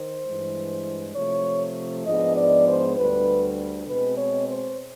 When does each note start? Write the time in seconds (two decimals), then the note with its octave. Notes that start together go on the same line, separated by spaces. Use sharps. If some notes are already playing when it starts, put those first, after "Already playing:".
Already playing: D#3 C5
0.25 G2 E3 G#3
1.15 C3 F3 A3 C#5
2.06 G#2 F3 G#3 B3 D4 D#5
2.37 D5
2.67 C5
2.97 D2 D3 G3 B4
3.88 B2 G#3 C4 B4
4.18 C#5
4.48 C5